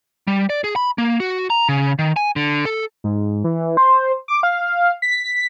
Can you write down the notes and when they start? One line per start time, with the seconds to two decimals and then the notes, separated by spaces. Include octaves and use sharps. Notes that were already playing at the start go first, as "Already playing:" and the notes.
0.27 G3
0.50 D5
0.64 G#4
0.76 B5
0.98 A#3
1.20 F#4
1.50 A#5
1.69 C#3
1.99 D#3
2.16 G#5
2.36 D3
2.65 A4
3.04 G#2
3.44 E3
3.77 C5
4.28 D6
4.43 F5
5.02 B6